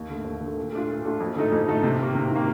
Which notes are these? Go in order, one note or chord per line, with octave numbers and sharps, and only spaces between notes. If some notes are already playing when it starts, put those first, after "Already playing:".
Already playing: D#2
D3 A3
D#2
D3
A3
A#2
A3 D4 F4
A#2
A3 D4 F4
F2
D3 A3 D#4 A4
F2
D3 A3 D#4 A4
C3
D#3 A#3
C3
D#3 A#3